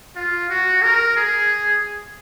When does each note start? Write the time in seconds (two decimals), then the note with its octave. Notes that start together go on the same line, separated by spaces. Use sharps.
0.16 F4
0.50 F#4
0.82 A#4
1.16 G#4